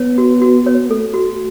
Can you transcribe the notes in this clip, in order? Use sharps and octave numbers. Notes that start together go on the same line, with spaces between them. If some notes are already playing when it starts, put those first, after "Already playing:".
Already playing: B3 C#5
F#4
F#4
C#5
A3 A4
F#4